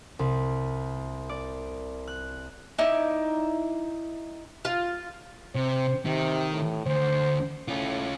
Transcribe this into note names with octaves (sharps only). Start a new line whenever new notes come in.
C2
D5
F#6
D#4 E4 D5
F4
C3 C5
C3 D#3
A2
D2 C5
A2 C#4 F4